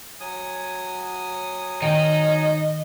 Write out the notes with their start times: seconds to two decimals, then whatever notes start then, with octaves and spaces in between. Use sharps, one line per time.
0.20 F#3 G#5 D#6
1.82 D#3 D#4 D#5 G5